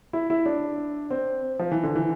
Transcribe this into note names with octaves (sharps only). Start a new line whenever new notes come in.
E4
E4
D4
C4
F3
E3
D3
E3